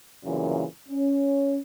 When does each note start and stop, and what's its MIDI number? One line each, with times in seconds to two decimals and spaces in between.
0.24 0.64 36
0.24 0.64 42
0.24 0.64 46
0.24 0.64 49
0.24 0.64 52
0.89 1.57 61